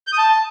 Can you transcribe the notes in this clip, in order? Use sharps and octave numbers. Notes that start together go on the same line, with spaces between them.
G6
D#6
A5